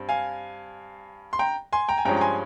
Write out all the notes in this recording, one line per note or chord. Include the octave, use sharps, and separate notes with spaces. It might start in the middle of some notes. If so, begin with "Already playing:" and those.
Already playing: G2 C4
F5 G#5
C6
G5 A#5
G#5 C6
G5 A#5
G#5
G2 F3 G#3 C#4 G5 A#5
A#5
G#5 C6